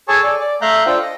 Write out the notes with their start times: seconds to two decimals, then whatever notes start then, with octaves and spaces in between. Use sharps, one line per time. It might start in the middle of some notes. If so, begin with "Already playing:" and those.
0.08 G#4 A4 C#5 G#5 A5 C#6
0.23 A4 D5 G#5
0.40 D5
0.62 A3 E5 F5 A#5 F#6 G6
0.86 D4 F4 A4 C5 G5
1.02 D#5